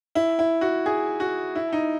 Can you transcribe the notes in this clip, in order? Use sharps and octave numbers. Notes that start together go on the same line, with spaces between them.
E4
E4
F#4
G#4
F#4
E4
D#4